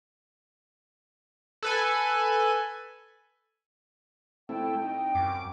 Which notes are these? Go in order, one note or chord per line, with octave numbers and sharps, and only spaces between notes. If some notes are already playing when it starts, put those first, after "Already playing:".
A4 B4 G#5
A3 C4 E4 G5
D#4 G5
F#2 D6